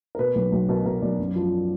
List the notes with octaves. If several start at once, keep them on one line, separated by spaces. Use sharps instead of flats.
A#4
B2 B4
B1
B1
B2 A#4
B2 A#4
B1 D5
F#2
F3